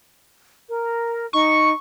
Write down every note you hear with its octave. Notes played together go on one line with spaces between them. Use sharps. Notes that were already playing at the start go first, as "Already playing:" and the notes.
A#4
D#4 C#6